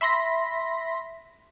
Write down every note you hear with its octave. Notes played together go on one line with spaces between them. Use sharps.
E5 B5 C6 A#6 B6